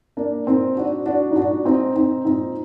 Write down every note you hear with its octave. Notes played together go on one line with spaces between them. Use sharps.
A#3 D4
A#2 C4 D#4
D4 F#4
D4 F#4
D#4
A#2 D4 F#4
C4 D#4
C4 D#4
A#2 C4 D#4